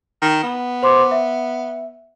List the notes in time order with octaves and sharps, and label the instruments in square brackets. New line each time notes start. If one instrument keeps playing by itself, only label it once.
[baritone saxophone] D#3
B3
[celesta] C5 C6 D6
E5